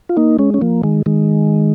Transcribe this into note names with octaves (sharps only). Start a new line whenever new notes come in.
F4
A#3 D#4
G#3 C#4
C#4
F3 A#3
D#3 G#3
D#3 G#3